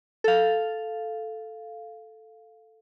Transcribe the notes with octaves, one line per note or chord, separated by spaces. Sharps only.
A4 F5